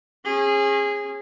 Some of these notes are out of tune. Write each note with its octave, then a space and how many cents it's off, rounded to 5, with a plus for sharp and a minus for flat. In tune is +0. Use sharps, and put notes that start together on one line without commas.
C#4 -35 G#4 -15